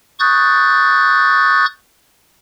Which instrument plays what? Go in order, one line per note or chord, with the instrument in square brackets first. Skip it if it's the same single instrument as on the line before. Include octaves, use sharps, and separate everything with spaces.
[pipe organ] C#6 D#6 F#6 G6 A6